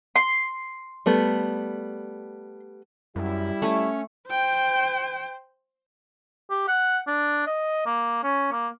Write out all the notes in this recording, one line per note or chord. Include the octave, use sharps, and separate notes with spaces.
C6
G3 A3 B3
F#2 G3 E4
A3 C#4
C5 G5
G4
F#5
D4
D#5
A#3
C#4
A#3